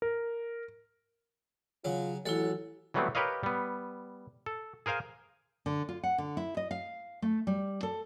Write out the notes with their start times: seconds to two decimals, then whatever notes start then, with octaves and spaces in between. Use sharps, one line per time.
0.02 A#4
1.85 C#3 F#3 F4
2.26 A1 F#3 E4 A4 F#5
2.94 E3 F#3 G3 A3 B3 C4
3.15 G4 A#4 B4 C#5 D#5 F5
3.43 G3 B3
4.46 A4
4.86 G#4 A#4 C5 F5 G#5
5.66 D3
5.89 F4
6.03 F#5
6.18 D3
6.37 E4
6.57 D#5
6.71 F5
7.22 A3
7.47 G3
7.83 A4